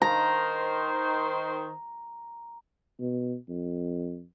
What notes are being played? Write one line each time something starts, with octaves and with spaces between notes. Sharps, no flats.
D#3 C5 A#5
B2
F2